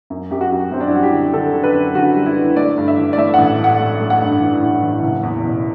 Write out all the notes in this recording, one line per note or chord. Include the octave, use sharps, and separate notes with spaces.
F#2
F#2 G4
F#4
F#2
F#2 C4
D4
E4
G3 F#4
G4
D3
D3 A4
D3
B4
F#2
D3 F#4
G3
E4
D3
A3 D5
G2
E5
E3
D5
A3 E5
A1 F#5
A3
F#5
A3
A3
F#5
G2
E3
A1
E3
F#1
E2
B2